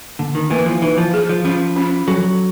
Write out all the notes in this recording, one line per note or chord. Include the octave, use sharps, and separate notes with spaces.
D3 A#3
D#3
E3 A#3
F3
E3 D#4
F3
G#4
F3
F3 C#4
C#4
F#3 A4